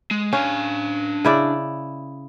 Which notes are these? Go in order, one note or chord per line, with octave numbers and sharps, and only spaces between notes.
G#3
C#4 D4 F5
C#3 E4 D5